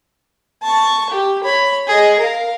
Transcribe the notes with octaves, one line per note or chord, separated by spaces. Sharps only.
A5 C#6
G4
C#5 B5
G#4 D#5
A#4 F5